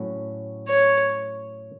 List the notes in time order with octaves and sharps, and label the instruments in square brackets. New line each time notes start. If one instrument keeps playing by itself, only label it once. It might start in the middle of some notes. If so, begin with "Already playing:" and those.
Already playing: [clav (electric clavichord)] A2 F#3 C#4 F#4
[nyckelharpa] C#5